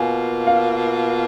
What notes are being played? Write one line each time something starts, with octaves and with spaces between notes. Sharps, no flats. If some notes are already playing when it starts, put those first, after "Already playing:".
Already playing: B2 A#3 F4 G#5
F5